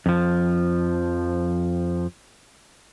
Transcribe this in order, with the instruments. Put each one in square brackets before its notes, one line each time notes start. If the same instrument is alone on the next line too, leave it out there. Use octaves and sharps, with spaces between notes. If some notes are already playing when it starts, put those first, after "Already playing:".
[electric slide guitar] F2 F3